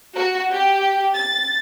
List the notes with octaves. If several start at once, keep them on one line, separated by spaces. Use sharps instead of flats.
F#4
G4
A6